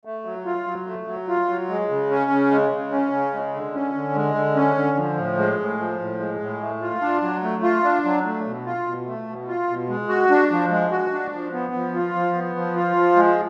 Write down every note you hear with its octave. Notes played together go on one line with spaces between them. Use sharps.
A3
F#3
F4
F#3
A3
F#3
F4
F#3
G#3
C#3
C#4
C#3
G#3
C#3
C#4
C#3
G#3
D3
C#4
D3
G#3
D3
C#4
D3
F3
A2
G#3
A2
F3
A2
G#3
A2
A3
F4
D4
F#3
A3
F4
D4
F#3
A3
B2
F4
B2
A3
B2
F4
B2
G#3
F#4
D4
F3
G#3
F#4
D4
F3
B3
F3
F4
F3
B3
F3
F4
F3
G#3